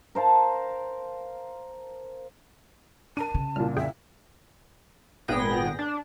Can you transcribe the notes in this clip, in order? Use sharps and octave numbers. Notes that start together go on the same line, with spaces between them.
A#4 C5 F5 A5
D4 A#4 A5 D#7
C#3
C2 A#2 F6
F2 G#4 E5 G5
G#1 A#2 B3 G#4 G5 A#6
D4